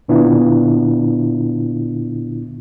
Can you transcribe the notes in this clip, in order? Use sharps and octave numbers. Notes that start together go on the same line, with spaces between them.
A#2 D3 B3 D4 E4 F4